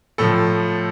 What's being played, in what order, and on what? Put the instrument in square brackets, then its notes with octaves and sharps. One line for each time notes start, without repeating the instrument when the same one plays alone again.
[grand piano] A2 F3 A4